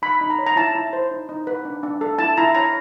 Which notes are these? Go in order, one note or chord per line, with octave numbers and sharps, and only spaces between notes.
D#4 B5
D#4
A#5
C#5
A#5
E4 A5
E4
C5
D#4
D#4
B4
D4
D4
A4
E4 A5
E4 A#5
C#5 A#5